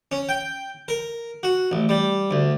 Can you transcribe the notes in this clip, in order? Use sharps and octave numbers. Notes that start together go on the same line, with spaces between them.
C#4
G5
A#4
F#4
A1
G3
D2